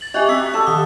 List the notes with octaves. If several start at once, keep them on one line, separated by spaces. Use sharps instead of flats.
A6 F#7
F#4 G4 D#5 E5 G#5
C4 A#5 E6 B6
A4 A5 E6
D#3 D#6